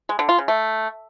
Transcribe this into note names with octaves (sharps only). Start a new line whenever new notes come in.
G#3
D3
F4
C#3
A3